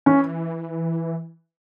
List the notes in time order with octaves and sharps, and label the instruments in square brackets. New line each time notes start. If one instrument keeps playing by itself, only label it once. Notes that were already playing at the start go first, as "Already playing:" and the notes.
[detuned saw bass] E3 [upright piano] C#4